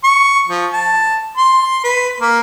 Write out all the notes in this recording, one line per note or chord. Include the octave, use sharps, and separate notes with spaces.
C#6
F3
A5
C6
B4
A#3